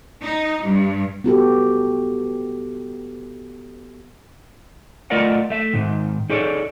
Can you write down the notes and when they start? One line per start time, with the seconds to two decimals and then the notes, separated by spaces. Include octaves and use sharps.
0.22 D#4
0.64 G2
1.24 B3 F#4 G4 A4
5.10 A3 F4 A#4 D5 D#5 F#5
5.50 A3 E5
5.74 G#2 D#3
6.30 D#4 G#4 A4 C#5 D5